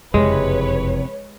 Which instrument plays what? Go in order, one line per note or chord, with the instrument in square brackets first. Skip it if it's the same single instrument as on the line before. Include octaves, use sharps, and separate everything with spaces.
[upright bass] F#1 F2 [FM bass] C3 [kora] G#3 [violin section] B4 C#5